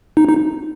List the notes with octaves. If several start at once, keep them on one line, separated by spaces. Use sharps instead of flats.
D#4
D#4